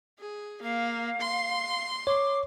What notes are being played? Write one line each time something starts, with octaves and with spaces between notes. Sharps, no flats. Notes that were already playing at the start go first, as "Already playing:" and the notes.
G#4
A#3 F5
C6
C#5 D6